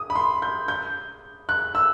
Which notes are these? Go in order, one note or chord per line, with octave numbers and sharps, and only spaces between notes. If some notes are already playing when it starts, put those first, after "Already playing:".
Already playing: D#6
B5
C6
G6
G6
F#6
E6